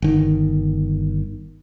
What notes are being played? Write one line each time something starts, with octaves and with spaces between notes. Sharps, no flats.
G1 D#3